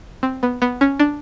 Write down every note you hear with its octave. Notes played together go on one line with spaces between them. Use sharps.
C4
B3
B3
C#4
D4